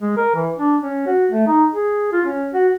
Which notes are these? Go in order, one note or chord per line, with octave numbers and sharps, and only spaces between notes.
G#3
A#4
E3
D4
C#4
F#4
A3
D#4
G#4
F4
C#4
F#4